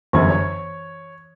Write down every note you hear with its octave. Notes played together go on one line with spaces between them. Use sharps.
G1 F#2 E3 G#6
C#5